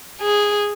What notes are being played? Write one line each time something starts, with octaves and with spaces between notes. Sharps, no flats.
G#4